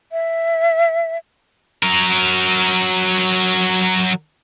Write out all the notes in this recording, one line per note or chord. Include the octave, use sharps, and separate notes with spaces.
E5
F#3 A#4